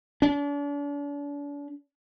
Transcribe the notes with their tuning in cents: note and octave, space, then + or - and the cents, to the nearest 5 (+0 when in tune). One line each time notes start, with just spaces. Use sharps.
D4 -40